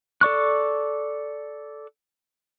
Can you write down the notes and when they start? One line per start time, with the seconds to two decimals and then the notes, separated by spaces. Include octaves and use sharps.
0.21 A4 D5 C#6 F#6